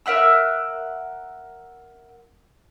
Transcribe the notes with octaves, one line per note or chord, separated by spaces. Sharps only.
A#4 E5 F#5 E6